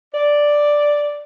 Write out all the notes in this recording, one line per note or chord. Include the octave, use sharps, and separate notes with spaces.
D5